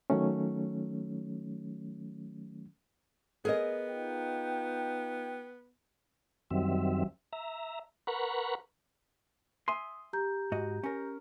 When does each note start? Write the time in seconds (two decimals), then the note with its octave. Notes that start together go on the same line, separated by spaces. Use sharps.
0.10 D#3 F#3 A3 C#4
3.45 B3 G#4 A#4 D#5
3.90 D#4 F4 G5
6.51 F#2 D#3 F#3 G3 C4 E5
7.33 E5 A#5
8.07 A#4 B4 F#5 A#5 B5 C#6
9.68 E5 G#5 C6 D#6
10.13 G4 A#5 G6
10.52 G#2 F#4 D#5
10.83 C#4 A#4